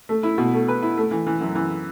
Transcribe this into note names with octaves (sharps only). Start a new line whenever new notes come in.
A3
E4
B2
A3
B4
E4
A3
E3
E3
F#2
E3